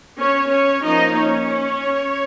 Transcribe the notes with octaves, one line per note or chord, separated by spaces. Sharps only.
C#4 C#5
C#4 C#5
F3 A#3 C#4 D#4 D#5
C#4 C#5